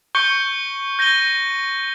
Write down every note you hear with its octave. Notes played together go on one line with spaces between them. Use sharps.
C#6 G6 C#7 G7
G6 A#6 D#7 G7